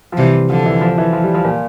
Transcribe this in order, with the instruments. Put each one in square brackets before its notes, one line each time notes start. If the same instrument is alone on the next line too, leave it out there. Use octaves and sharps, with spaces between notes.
[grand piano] F3
[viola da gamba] C3 E3 [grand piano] G3
[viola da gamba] D3 [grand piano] F3
[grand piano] E3
F3
E3
F3
G3
F3
A#2